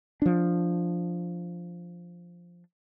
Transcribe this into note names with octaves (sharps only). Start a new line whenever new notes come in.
F3 D4